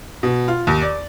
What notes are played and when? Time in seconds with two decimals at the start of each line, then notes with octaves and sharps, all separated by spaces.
0.23 B2
0.48 F4
0.67 D#2
0.82 D5